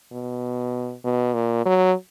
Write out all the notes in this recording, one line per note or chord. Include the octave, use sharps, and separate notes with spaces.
B2
B2
A#2
F#3